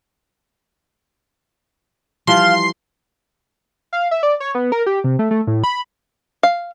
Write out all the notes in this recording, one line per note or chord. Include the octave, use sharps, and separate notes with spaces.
E3 F3 G3 F5 C6
F5
E5
D5
C#5
B3
A#4
G4
C3
A3
A3
A2
B5
F5